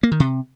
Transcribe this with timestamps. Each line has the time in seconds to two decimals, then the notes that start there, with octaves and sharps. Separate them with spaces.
0.03 A#3
0.12 D#3
0.20 C3